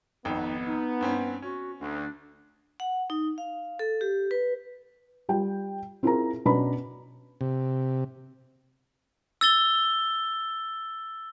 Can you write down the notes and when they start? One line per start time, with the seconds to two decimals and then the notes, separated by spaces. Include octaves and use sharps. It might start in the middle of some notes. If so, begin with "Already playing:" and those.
0.25 G#1 F2 B3 D#4 G5
0.66 D#4
1.01 G2 C4 C#4
1.42 C#4 F#4
1.80 D2 D4
2.80 F#5
3.10 D#4
3.38 F5
3.79 A4
4.01 G4
4.31 B4
5.29 G3 F4 G5
6.03 C4 E4 F4 G#4 A#4 A#5
6.45 B2 C#4 D4 B4 A#5 B5
7.41 C3
9.41 E6 A6 G7